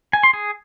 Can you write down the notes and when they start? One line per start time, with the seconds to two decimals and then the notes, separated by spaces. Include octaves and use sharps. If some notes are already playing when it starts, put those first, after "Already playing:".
0.13 G#5
0.23 C6
0.33 G#4